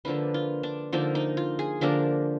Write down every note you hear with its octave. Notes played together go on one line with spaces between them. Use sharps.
D3 F3 A#3 D4 B4
F4
D4
D3 F3 A#3 D4 D#4
D#4
F4
G#4
D3 F3 A#3 D4 A#4